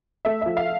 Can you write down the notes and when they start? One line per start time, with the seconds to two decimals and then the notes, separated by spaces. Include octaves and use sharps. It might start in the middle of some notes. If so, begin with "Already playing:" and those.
0.25 A3 E5
0.42 F3 E5
0.57 F5